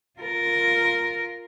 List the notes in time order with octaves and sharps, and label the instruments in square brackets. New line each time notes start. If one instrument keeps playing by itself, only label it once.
[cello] F4 A#4